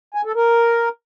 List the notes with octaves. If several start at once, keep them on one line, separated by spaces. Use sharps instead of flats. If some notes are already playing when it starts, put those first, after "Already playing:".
G#5
A4
A#4